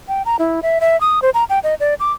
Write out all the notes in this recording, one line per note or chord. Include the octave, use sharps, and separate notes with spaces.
G5
A#5
E4
E5
E5
D#6
C5
A#5
G5
D#5
D5
D6